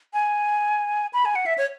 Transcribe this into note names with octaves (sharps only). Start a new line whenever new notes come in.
G#5
B5
G#5
F#5
E5
C#5